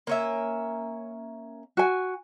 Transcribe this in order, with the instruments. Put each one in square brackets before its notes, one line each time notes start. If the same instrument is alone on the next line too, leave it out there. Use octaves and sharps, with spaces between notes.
[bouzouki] A#3 C#4 E5
[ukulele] F#4 G#5